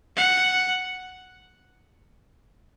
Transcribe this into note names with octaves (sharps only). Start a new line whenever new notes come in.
F#5